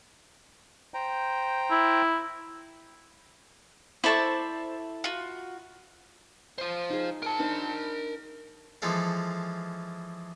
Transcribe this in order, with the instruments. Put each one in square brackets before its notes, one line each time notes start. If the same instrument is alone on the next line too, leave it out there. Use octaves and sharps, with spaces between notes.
[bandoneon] C5 G5 A#5
[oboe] E4
[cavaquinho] E4 A4 C#6 [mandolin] C5 D5 A5
[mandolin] F4 F#4
[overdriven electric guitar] F4 C5
[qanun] D#4 G#4
[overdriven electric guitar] A#4 A5
[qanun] D4 D#4 C5
[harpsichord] E3 F3 G#3 A4 F5